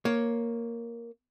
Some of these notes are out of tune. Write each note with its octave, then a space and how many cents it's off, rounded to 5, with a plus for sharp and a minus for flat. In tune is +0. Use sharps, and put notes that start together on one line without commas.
A#3 +0 C#5 +0